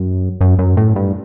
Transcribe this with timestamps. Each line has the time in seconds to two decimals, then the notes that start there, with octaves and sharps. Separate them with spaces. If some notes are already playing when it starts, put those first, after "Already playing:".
Already playing: F#2
0.41 F#2
0.59 F#2
0.77 A2
0.96 G2